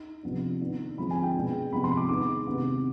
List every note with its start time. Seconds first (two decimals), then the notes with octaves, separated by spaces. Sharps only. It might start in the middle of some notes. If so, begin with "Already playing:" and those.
Already playing: D#4
0.23 C3 F3 B3 D4
0.61 D#3 B3 D4
0.97 D3 F3 G#3 C4 B5
1.11 G#5
1.23 G5
1.35 B2 G#3 D4
1.72 C3 F3 B3 B5
1.84 C6
1.97 D6
2.09 D#3 G#3 B3 D#4 D6
2.47 C3 D#3 B3 D#4